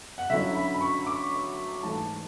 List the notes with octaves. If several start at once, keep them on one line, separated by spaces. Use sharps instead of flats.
F#5
D3 F#3 C#4 E4 E5
B5
B5
C#6
D6
G#2 E3 A3 A5